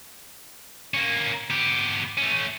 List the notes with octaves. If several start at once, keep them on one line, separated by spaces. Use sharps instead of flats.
A#3 C#4
B3 G4
A3 C#4